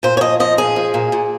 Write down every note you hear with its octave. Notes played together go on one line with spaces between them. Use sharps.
A#2 C5
C#5
F3 D#5
F3 D#5
A#2 G#4
F3
A#2
A#2